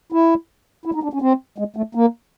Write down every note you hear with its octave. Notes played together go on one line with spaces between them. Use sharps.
E4
E4
D#4
D4
C#4
C4
G#3
A3
A#3